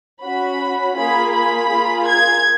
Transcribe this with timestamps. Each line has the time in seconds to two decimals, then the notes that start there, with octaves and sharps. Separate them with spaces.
0.21 C#4 F#4 B5
0.95 A#3 F4 G#4 B5
1.33 B5
1.70 A#3 F4 G#4
2.06 G#6